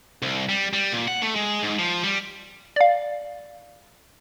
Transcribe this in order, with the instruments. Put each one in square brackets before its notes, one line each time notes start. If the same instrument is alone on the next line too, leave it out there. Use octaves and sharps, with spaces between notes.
[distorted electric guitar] C2
G3
G3
A#2
F#5
A3
G#3
G#2
F3
G3
[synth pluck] D5 F5